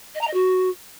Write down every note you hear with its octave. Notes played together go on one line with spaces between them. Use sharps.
D#5
A#5
D#5
F#4